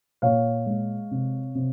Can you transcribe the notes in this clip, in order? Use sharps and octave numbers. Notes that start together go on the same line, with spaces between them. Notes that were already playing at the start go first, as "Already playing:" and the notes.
A#2 C#5 F5
G#3
C3
C3